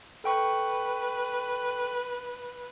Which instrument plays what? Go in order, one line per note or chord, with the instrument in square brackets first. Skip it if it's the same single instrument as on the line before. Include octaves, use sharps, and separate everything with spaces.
[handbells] A4 G5 C#6 [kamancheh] B4